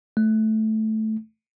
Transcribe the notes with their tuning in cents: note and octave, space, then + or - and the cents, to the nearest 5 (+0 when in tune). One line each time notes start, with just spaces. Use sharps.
A3 -10